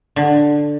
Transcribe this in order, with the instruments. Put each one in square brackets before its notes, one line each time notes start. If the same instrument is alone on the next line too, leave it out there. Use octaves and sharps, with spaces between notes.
[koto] D3